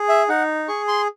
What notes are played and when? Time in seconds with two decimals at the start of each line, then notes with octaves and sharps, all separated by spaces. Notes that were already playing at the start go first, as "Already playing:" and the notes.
Already playing: G#4
0.09 E5
0.29 D#4 F#5
0.68 G#4 C#6
0.88 C6